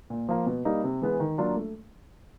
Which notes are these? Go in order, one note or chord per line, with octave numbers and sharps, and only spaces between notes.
A#2
F3 A#3
B2
G3 A#3 D#4
C3
E3 G#3 B3
D#3
F#3 A#3 D4 F4
A3